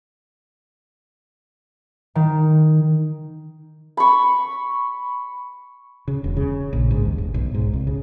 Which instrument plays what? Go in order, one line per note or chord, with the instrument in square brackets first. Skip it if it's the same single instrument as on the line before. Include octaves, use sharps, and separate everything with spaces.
[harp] D#3
[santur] B5 C#6
[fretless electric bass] C#3
E1
C#3
A#1
G#2
D#2
G1
B1
G#2
C2
C#3